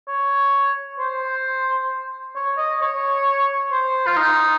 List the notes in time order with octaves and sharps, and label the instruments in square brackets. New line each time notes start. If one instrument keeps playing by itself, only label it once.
[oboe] C#5
C5
C#5
D#5
C#5
C5
F4
D#4